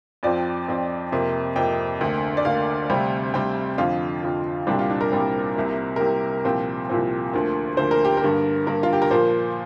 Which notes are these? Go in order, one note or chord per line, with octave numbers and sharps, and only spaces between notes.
F2 F3 C4 D5
F2 F3 C4
F2 C3 A#3
F2 C3 A#3 G5
D2 D3 A#3
D5
D2 D3 A#3 F5
D2 C3 G3 C4
D2 C3 G3 C4 G5
F2 D3 F3 F4
F2 D3 F3
C2 A#2 G3 C4 D4
F4
D4
A#4
C2 A#2 G3 C4
C2 C3 A#3
A#4
C2 C3 A#3 G4
C2 A#2 F3 C4
C2 A#2 F3 C4
D2 D3 F3 A#3
D2 D3 F3 A#3 C5
A#4
G4
A#4
G2 D3 A#3
G2 D3 A#3 A#4
F4
G4
A#4
A#2 F3 A#3 C5